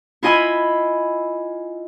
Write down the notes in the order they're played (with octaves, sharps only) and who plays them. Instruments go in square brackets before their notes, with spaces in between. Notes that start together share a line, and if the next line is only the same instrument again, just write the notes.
[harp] E4 F4 D#5 G#5 B5 E6